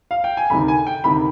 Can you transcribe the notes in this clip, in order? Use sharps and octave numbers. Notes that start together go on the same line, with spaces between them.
F5
G5
G#5
D2 C3 D#3 B5
G#5
G5
D2 C3 D#3 B5